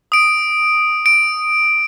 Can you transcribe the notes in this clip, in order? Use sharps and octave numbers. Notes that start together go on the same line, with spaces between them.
D#6 D7
D7